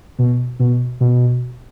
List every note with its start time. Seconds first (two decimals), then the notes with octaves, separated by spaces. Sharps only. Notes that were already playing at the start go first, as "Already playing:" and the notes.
0.19 B2
0.59 B2
1.00 B2